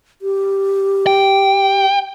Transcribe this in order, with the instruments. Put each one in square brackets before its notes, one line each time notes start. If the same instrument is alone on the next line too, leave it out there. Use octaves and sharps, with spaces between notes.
[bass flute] G4
[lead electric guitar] G5